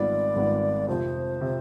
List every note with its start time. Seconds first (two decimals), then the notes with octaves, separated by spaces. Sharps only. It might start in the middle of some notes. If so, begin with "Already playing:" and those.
Already playing: G#1 G#2 G3 B3 F4 D5
0.36 G#1 G#2 G3 B3 F4
0.88 F2 C3 F3 C5
1.40 C3 F3